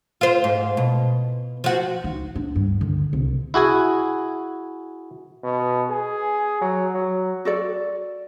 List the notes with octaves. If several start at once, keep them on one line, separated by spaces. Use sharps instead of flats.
F4 C5
G#2
B2
F3 F#4
D#4
D4
G2
D3
C2
E4 F#4 G#4 G#5
B2
G#4
F#3
F#3
F#4 A4 D5